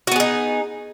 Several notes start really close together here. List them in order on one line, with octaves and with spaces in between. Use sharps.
F#4 B3 G#4 D#4